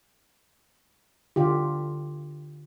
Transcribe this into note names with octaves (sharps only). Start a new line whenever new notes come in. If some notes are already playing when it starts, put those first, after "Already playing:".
D3 F4 G4